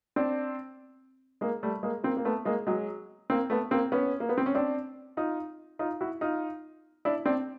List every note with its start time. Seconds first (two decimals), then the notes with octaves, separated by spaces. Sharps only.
0.16 C4 D4
1.41 G#3 A#3
1.63 G3 A3
1.83 G#3 A#3
2.04 A#3 C4
2.17 A#3
2.25 A3 B3
2.45 G#3 A#3
2.67 F#3 G#3
3.30 A#3 C4
3.50 A3 B3
3.71 A#3 C4
3.92 B3 C#4
4.20 A#3
4.29 B3
4.38 C4
4.46 C#4
4.55 C4 D4
5.17 D#4 F4
5.79 D#4 F4
6.01 E4 F#4
6.21 D#4 F4
7.05 D4 E4
7.26 C4 D4